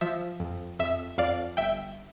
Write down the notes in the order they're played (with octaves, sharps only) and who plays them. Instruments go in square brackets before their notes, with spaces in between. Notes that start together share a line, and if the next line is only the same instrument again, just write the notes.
[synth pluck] F3 E5
F2
F2 E5
F2 D5 F5
G1 E5 G5